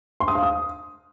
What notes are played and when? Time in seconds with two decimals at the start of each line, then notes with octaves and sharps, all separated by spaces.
0.20 C6
0.28 D#6
0.35 F5
0.43 D#6